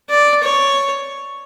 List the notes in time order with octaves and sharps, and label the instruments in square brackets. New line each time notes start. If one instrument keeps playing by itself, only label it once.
[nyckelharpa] D5
C#5